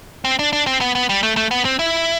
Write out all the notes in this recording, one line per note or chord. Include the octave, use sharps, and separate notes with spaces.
C4
D4
D4
C4
B3
B3
G3
A3
A3
B3
C4
E4